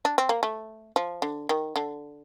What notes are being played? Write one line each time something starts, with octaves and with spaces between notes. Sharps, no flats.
D4
C4
A#3
A3
F3
D3
D#3
D3